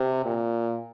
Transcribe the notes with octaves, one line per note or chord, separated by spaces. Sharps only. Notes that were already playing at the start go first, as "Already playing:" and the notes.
Already playing: C3
A#2